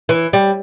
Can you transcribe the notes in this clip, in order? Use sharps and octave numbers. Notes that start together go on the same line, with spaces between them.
E3
G3